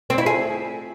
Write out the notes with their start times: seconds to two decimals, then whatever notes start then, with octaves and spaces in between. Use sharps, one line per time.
0.10 C4
0.18 E4
0.26 G#4